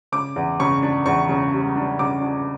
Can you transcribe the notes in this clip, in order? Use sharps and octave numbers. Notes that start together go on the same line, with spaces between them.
C#3 D6
E2
C#3 C#6
D4
E2 C#6
C#3
G3
D4
C#3 D6
D4